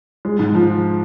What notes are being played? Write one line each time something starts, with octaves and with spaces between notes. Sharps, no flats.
G#3
G#2
F3